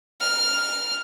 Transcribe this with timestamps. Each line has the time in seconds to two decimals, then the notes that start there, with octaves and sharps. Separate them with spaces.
0.21 F6